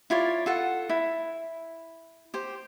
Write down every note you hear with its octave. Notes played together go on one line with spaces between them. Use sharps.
E4 F4 C#5 D5
F4 A4 F#5
E4
G4 C5